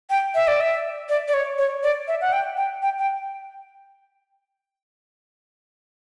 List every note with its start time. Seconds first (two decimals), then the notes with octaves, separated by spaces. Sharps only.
0.10 G5
0.35 E5
0.48 D5
0.61 E5
1.09 D5
1.28 D5
1.34 C#5
1.58 C#5
1.83 D5
2.08 E5
2.21 F#5
2.32 G5
2.57 G5
2.82 G5
2.99 G5